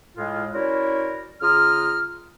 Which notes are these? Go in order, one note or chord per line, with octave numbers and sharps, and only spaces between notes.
A2 G#3 F4
C#4 E4 F#4 A#4 C5 D5
C#3 F4 A#5 D#6 F6